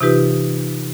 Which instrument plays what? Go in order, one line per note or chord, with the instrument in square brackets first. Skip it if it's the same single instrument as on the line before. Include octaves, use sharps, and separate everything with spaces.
[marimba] C3 E3 D#4 F4 G4 B4